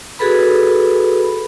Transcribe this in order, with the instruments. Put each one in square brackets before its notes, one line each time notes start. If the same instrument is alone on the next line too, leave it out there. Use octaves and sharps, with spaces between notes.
[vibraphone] F#4 G#4 A4 B4 B5